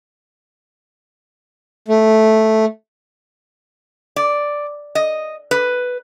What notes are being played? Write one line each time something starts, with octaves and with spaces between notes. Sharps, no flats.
A3
D5
D#5
B4